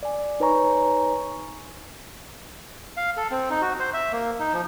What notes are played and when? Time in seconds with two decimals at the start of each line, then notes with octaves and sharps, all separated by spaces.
0.03 D5 G#5
0.40 D#4 B4 C#5 G#5 A#5 C#6
2.97 F5
3.17 A4
3.31 C4
3.50 D#4
3.62 F#4
3.79 C5
3.94 E5
4.12 A#3
4.39 D#4
4.53 F3